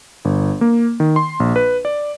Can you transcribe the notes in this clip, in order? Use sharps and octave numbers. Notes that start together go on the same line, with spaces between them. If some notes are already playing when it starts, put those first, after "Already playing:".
G1
A#3
D#3
C6
A#1
B4
D5